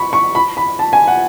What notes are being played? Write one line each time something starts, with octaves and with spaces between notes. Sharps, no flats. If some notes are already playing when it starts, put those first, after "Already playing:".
Already playing: B5 C#6
C#6
B5
B5
A5
G#5
F#5